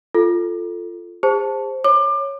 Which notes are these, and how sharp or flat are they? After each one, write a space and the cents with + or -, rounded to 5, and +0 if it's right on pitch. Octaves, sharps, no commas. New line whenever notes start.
F4 -5 A4 +0
G#4 -40 C5 +0 A5 +0
C#5 +0 D6 +30